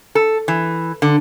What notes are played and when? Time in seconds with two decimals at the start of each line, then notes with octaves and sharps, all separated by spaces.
0.15 A4
0.48 E3
1.02 D3